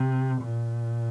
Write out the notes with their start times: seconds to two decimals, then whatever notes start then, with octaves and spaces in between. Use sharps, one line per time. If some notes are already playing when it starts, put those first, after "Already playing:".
Already playing: C3
0.41 A#2